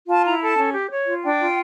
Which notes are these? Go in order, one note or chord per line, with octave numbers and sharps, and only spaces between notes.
F4 A5
E4 A#5
A4 A5
C#4
G4
C#5
F4
D4 G5
F4